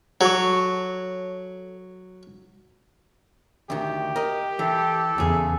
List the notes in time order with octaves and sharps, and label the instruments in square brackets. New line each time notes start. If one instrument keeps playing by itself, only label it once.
[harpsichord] F#3 [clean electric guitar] A4 C#5
[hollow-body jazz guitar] D2 D#3 [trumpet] G4
[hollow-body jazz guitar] A#4 D#5
[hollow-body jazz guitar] E3 [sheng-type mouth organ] A4
[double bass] E2 [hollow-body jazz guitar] C#3 G#4